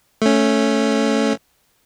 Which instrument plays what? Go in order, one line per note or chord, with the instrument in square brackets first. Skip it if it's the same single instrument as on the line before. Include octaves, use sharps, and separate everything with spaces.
[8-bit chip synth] A3 C#4